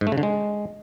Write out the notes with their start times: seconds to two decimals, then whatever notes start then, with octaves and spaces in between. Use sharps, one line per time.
0.01 G#2
0.07 A3
0.12 C#3
0.18 D3
0.23 G#3